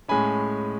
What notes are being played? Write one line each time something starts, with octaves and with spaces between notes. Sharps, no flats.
A2 G#3 C#4 G#5 B5